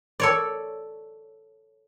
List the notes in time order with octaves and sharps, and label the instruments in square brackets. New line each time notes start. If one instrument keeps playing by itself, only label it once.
[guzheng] A4 C#5 D5